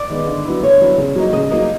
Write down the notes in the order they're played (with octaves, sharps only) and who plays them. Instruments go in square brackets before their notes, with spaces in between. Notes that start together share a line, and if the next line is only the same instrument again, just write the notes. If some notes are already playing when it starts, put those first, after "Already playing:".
Already playing: [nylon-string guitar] D5
[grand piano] D#3 G#3 B3
D3
F#3 B3 E4
[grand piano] D3 [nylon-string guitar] C#5
[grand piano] F#3 B3 E4
C#3
F#3 A#3 D#4
[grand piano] C#3 [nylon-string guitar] D#5
[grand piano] F#3 A#3 D#4